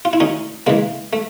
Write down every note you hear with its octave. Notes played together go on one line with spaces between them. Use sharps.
F4
E4
D2 C#4 D#4
C#3 E3 G#3 A#3
A3